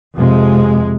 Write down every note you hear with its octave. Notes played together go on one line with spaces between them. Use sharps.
F2 C3 G#3